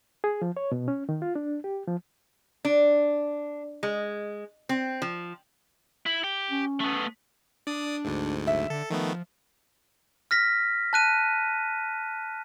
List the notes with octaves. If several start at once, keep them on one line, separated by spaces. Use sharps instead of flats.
G#4
F3
C#5
B2
C#4
D#3
F4
D4
G4
F3
D4
G#3
C4
F3
E4
G4
C#4
A3 B3
D4 D5 D#6
D2 G#2
F#1 E5
D3 A4
D#3 F3 A3 B3
F6 A#6 B6
A5 F#6 D#7